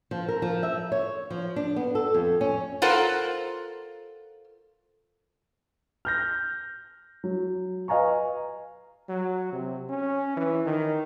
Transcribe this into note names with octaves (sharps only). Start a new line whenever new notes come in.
F3
A#4
F3
E5
C#5
F3
D4
B3
A4
F2
C#4
F4 A4 A#4 C5 F#5
F6 G6 A#6
F#3
B4 D#5 F5 G#5 A#5 C#6
F#3
C3
C#4
E3
D#3